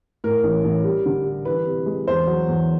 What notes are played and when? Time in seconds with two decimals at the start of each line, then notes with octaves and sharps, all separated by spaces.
0.24 A2 A#4
0.43 A1
0.64 A1
0.84 G3
1.06 D3
1.25 G3
1.45 E3 B4
1.66 C3
1.86 G#3
2.07 E2 C5
2.27 F#3
2.48 E2